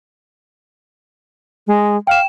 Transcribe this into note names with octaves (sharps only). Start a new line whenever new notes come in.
G#3
F5 G5 E7